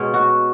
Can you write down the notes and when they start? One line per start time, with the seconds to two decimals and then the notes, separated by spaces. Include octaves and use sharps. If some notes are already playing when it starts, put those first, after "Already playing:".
Already playing: B2 G#3 C#4
0.14 F#4